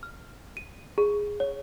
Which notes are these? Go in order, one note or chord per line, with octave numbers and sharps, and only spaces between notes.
F6
D#7
G#4
C#5